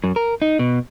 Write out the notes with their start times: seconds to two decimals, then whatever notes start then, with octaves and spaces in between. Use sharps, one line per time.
0.04 F#2
0.16 A#4
0.42 D#4
0.59 B2